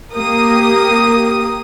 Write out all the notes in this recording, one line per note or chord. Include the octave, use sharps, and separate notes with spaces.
A#3 G4 A#4 D#6